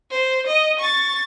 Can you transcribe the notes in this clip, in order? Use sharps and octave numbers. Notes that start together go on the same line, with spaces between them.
C5
D#5
C#6 A6